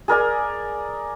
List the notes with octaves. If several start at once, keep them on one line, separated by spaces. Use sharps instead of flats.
G#4 A#4 D5 G#5